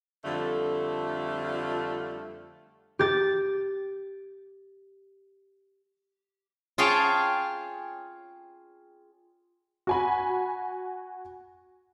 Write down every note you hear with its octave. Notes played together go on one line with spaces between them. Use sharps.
F2 D3 G3 A3 F4 A4
G4 A6
F4 G#4 C#5 F5 G5 A5
F#4 G#5 B5